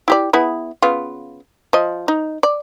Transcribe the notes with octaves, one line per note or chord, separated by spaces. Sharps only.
E4 G4 D5
B3 E4 G#4
C#3 B3 F4
F3 D#5
D#4
D5